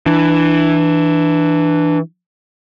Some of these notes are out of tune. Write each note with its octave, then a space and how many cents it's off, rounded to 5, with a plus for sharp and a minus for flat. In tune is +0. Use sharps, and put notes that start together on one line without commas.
E3 +0 D4 +10